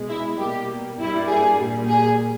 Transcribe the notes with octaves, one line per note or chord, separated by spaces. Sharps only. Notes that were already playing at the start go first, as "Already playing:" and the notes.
Already playing: B2 G#3
E4
B2 G3 A#3 G4
G2 G3 A#3 E4
G#4
A#2 G3 A#3
G#4